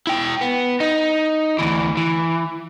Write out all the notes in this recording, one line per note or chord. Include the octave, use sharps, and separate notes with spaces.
E4 G5
B3
D#4
D2 E3
E3